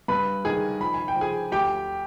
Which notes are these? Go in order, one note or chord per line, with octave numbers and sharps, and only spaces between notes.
G2 B4 B5
D#3 G#4 G#5
F3 B5
G#5
G5
F3
G#4 G#5
D2 G4 G5